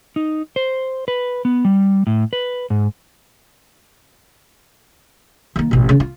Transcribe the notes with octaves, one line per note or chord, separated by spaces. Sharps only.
D#4
C5
B4
B3
G3
A2
B4
G#2
D#3 A#3
A1 B2
C#3
F4